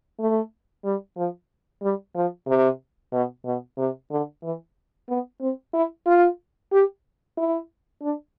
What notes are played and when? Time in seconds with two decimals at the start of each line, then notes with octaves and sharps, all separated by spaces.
0.19 A3
0.84 G3
1.17 F3
1.82 G3
2.15 F3
2.47 C3
3.13 B2
3.45 B2
3.78 C3
4.11 D3
4.43 E3
5.09 B3
5.41 C4
5.74 E4
6.06 F4
6.72 G4
7.37 E4
8.02 D4